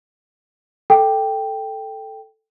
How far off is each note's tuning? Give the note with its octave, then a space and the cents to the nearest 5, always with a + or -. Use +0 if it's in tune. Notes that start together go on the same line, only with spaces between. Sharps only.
A4 +0 G5 +0